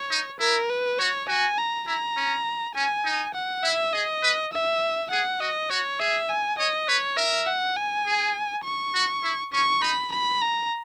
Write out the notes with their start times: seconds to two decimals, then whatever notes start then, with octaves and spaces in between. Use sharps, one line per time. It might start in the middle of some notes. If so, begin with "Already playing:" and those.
Already playing: C#5
0.11 D#4
0.39 E4 A#4
0.70 B4
0.99 F#4 C#5
1.28 F#4 G#5
1.58 A#5
1.87 E4 A#5
2.17 C#4
2.75 C#4 G#5
3.05 D#4
3.34 F#5
3.63 E4 E5
3.93 G#4 D#5
4.23 B4
4.53 E5
5.11 G#4 F#5
5.40 F#4 D#5
5.70 F#4 C#5
5.99 G#4 E5
6.29 G#5
6.59 C#5 D#5
6.88 B4 C#5
7.17 A#4 E5
7.47 F#5
7.76 G#5
8.06 G#4
8.64 C#6
8.95 F#4
9.23 E4
9.53 C#4 C#6
9.82 D#4 B5
10.12 B5
10.42 A#5